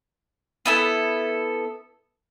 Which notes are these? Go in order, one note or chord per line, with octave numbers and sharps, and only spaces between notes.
B3 E4 A4